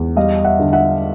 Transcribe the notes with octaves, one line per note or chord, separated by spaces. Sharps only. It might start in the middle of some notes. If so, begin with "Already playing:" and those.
Already playing: E2
G3 D#5 F5
E5 F#5
D3
E5 F#5